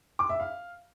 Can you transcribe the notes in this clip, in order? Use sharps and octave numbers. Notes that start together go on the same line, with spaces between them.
D6
E5
F5